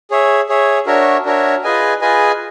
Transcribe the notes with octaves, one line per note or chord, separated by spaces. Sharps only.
G#4 C#5 E5
G#4 C#5 E5
D4 F#4 A#4 C#5 E5
D4 F#4 A#4 C#5 E5
F4 G#4 B4 D#5 G#5
F4 G#4 B4 D#5 G#5